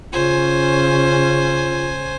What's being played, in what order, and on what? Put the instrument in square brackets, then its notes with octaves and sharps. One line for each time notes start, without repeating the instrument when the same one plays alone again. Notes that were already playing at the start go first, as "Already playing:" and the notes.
[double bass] C#3 C#4 [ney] F4 [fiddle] C5 G#5